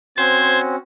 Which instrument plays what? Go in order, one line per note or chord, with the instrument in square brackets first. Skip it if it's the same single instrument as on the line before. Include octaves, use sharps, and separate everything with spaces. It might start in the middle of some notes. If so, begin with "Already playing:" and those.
[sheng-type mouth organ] C4 C#4 F#4 [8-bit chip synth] C5 [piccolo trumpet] G#6